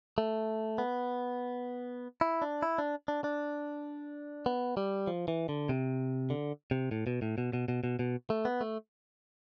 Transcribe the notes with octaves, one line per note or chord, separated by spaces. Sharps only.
A3
B3
E4
D4
E4
D4
D4
D4
B3
G3
F3
E3
D3
C3
D3
C3
A2
B2
A2
B2
B2
B2
B2
B2
A3
B3
A3